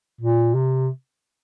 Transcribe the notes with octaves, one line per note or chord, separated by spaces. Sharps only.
A#2
C3